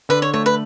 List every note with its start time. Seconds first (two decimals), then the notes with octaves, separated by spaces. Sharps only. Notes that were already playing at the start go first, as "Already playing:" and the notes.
0.09 D3 B4
0.22 C#5
0.34 A3 C#5
0.46 B4